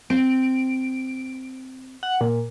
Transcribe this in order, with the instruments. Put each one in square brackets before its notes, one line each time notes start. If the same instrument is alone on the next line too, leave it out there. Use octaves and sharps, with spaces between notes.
[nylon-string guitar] C4 [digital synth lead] D7
[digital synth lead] F#5
A#2